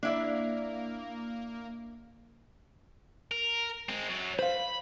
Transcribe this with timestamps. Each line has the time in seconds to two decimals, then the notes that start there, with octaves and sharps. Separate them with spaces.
0.03 A#3 D4 E4 D5
3.31 A#4
3.89 G#3 C4
4.09 F#2 F#3
4.39 C5 F5 B5